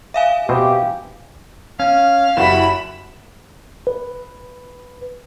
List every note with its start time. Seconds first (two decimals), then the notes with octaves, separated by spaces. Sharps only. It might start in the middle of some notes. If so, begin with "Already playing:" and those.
0.14 E5 F5 G#5
0.49 B2 C4 G4
1.80 C#4 F5
2.37 F#1 E4 F#4 G4 B5 E7
3.87 B4